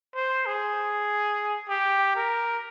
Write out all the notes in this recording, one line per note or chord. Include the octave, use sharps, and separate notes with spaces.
C5
G#4
G4
A#4